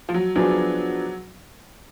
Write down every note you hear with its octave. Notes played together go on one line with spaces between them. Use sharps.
F3
F#3
F3 F#3 B3 D4 G#4